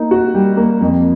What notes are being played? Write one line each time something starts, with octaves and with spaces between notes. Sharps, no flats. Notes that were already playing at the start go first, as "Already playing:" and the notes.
Already playing: A#3 D#4
F#4
G3
A#3
F2